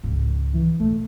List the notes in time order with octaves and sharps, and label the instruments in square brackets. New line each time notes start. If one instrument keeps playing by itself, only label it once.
[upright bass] C#2 G#2
[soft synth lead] E3
[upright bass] B1 [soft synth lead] A3